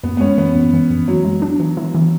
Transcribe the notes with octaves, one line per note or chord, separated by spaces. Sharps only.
F#2 B3
B3
G#3 C#4
E3 B3
F#2
E3
F#2
E3 F#3
G#3
D4
E3
E3
E3